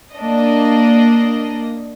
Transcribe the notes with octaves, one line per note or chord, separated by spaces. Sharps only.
A#3 D4 D#5